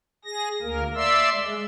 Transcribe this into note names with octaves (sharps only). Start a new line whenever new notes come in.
G#4 A#6
D2 A#3 A#4
D5 E5 C6 E6
G#3